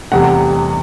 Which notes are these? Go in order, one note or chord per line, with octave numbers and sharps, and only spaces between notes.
F1 E2 C3 E3 G3 F#5